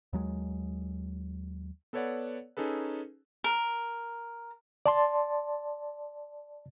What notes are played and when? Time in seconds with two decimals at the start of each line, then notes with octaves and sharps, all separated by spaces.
0.13 D#2 F#3 G#3
1.93 B3 A4 B4 C#5 D5 F#5
2.57 C#4 D#4 G#4 A4 B4
3.44 A#4
4.86 D5 A5 C6